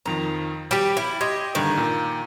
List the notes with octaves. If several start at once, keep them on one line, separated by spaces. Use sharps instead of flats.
F2 D#3 F3 A#5
G3 G4 D6 B6 D7
E4
G4 D#5 C6 G#6
A#1 G2 D3 D#3
A#2